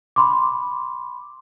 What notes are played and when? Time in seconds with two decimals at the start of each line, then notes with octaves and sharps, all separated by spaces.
0.16 B5 C6 D6